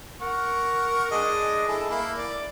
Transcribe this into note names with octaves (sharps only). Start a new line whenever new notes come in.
A#4 F#5 C#6
G#3 D4 D#5
E4 G#4 A4
A#3 E4
D5